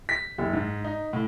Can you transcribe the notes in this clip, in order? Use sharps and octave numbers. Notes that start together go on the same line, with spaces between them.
B6
F#1
G#2
D#4
A2